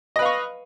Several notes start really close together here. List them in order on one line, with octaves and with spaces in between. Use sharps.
D#5 B4 F5 C#6